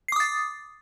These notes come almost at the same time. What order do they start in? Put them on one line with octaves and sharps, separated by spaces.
C7 D6 D#6 A6